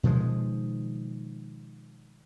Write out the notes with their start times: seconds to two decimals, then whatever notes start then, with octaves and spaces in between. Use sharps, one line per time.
0.03 B2 D#3 F3 G#3